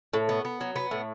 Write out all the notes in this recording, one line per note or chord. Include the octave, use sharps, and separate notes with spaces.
A2
B3
B3
F#3
B3
A2